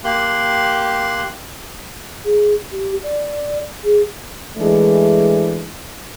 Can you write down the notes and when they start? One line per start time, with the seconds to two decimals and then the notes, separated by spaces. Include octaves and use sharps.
0.04 A#3 G4 C6 F#6
2.24 G#4
2.72 G4
3.04 D5
3.84 G#4
4.57 E3 G#3 A3 D4